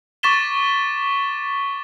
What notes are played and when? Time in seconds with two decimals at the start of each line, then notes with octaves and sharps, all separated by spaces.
0.23 C#6 D6 A6 B6 E7 G7